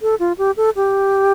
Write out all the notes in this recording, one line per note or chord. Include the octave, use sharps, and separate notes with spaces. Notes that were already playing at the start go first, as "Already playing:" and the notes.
A4
F4
G4
A4
G4